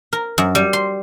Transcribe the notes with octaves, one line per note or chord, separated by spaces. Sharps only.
A#4
F#2
G3
C6